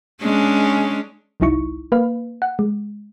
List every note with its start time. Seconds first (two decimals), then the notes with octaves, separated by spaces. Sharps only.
0.22 G#3 C#4 D4
1.40 G1 C2 F#3 D#4 E4 C#6
1.92 A#3 B4 F5
2.42 F#5
2.59 G#3